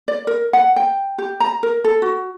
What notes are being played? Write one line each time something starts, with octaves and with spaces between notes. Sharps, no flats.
D5
A#4
F#5
G5
G4
A#5
A#4
A4
F#4